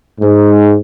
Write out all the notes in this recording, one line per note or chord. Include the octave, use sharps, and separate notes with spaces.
G#2